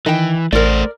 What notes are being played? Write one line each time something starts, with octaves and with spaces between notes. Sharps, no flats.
D#3 E3 D#5 G5
A1 A3 A#4 C5 D5